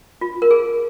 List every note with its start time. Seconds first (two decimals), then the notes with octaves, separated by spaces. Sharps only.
0.21 F4
0.42 A#4
0.51 G#4